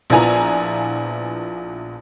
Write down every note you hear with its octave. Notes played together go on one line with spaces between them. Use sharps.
A#1 F3 B3 E4 G#5 A#5